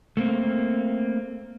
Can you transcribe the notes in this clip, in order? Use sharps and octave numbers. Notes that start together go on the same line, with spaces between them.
A3 A#3 C4